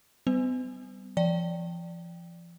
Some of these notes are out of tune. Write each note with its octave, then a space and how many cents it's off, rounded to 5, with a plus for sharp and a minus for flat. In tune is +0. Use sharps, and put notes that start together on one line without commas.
G3 -15 B3 +45 C5 -40
F3 -35 D5 +0 G5 +0